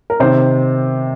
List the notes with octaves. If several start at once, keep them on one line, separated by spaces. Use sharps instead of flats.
A#4
C3 D#3 C5